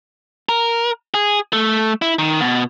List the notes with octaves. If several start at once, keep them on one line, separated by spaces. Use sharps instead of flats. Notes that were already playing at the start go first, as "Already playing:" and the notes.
A#4
G#4
A3
E4
D#3
B2